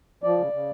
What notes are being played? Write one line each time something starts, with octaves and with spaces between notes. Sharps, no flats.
F3 D5
C#3
C#3